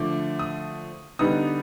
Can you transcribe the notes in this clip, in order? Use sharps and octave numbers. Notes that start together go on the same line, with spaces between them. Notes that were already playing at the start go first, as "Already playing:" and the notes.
Already playing: D3 F3 A3 D6
D#6
D3 G3 B3 D#4 D#6